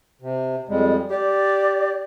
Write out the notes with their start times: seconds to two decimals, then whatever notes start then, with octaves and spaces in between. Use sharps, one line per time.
0.22 C3
0.69 F2 G3 G#3
1.10 G4 D5